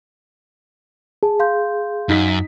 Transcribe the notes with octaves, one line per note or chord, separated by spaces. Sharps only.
G#4 A5
F5 C6 G6
F#2 D#4 B6